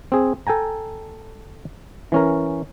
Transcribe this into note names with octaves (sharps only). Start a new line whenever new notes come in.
C4 G#4
A4 G5 G#5 A#5
E3 C#4 A#4